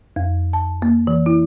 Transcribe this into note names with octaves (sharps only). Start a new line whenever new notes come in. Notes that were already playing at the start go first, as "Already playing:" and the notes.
F2
A5
A#3
E3
E4